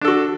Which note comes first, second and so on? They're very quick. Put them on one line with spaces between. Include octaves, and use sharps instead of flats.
D4 A4 F#4